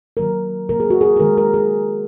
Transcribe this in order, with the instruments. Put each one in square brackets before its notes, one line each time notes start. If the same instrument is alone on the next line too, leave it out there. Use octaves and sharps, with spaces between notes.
[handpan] D#3 F#3 A#3 A#4
C#3 F#3 A#3 A#4
G#4
F#4
G#4
G#4
D#3 G#3 A#4
A#4
G#4